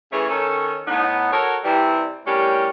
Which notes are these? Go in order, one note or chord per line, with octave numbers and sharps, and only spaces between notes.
C#3 E3 A3 G#4 C#5
D#3 C#4 A4
A2 B3 D#4
F#4 A4 A#4 C#5
C3 E3 G3 C4 E4
A2 G3 C#4 D4 G4 A#4